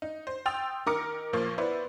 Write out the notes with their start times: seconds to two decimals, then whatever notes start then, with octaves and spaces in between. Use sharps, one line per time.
0.02 D#4
0.27 C5
0.46 G5 C6 D#6 E6 A6 F7
0.86 D#3 A#4 A#5 D6 F6 C#7
1.33 B1 A#2 F3 A#3 C5 C#6
1.58 B3 E4 B4 C5 D5